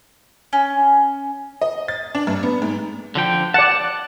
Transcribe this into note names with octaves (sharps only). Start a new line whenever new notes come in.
C#4
D#5
A6
D4
G2
B3
G#2
D3 F3 G5
D5 F#5 A5